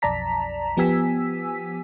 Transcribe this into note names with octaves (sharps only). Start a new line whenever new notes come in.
B1 F2 D5 A5 A#5 B6
F3 B3 G4 G#5 E6 B6